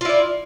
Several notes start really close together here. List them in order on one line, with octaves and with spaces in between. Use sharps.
F4 E4 D5